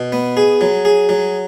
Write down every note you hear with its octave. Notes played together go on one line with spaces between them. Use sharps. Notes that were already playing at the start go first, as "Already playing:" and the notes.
Already playing: B2
B3
G#4
F#3
G#4
F#3